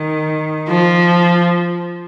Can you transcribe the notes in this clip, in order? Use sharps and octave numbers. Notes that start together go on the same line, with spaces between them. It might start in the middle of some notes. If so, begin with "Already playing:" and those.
Already playing: D#3
F3